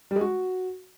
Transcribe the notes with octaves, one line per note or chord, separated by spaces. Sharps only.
G3
G#3
F#4